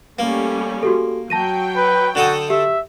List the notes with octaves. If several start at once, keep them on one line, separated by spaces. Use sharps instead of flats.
G3 A3 A#3 C#4
F#4 G4 A4
F#3 G5 A5 A#6 D#7
B4
D3 F#4 A4 D#6
G4 E5